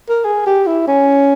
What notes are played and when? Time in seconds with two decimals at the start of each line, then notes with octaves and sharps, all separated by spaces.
0.09 A#4
0.25 G#4
0.46 G4
0.66 E4
0.87 C#4